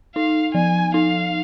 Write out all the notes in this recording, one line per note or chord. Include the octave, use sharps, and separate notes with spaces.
D#4 F5
F3 G#5
D#4 F5